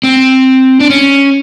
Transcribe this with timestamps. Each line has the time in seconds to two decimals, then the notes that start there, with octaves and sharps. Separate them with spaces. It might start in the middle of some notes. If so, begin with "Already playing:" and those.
0.04 C4
0.80 D4
0.90 C#4